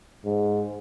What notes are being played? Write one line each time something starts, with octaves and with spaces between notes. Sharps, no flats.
G#2